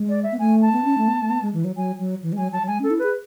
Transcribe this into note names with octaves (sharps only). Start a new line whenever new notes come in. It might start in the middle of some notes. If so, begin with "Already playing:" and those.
Already playing: G#3
D5
E5
B3
A3 G#5
A5
B3
C#4
A3
B3
A3
B3
G#3
E3
F#3
F#3 G#5
F#3
E3
G#3
F#3 G#5
F#3 A5
F#3
G#3 G#5
C#4
A4
E4
G#4 B4